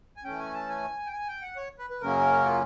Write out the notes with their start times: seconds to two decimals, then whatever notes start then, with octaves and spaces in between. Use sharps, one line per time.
0.17 G#5
0.24 E3 A3 C#4 G5
0.39 G#5
0.54 A5
0.69 G#5
1.06 G5
1.12 G#5
1.28 G5
1.42 F#5
1.57 C#5
1.79 B4
1.90 B4
2.01 F#2 C#3 F#3 A#3 C#4 A#4
2.45 F4